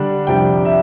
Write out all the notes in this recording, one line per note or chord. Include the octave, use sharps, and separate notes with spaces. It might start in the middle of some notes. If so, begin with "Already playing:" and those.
Already playing: D3 G3 D4
F2 C3 G3 D4 G5
E5